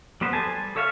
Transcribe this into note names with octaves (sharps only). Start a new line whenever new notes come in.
G3 B3 B4 C5
A4 C5 G#5 A5
G3
A4 C#5 E5 F5 C#6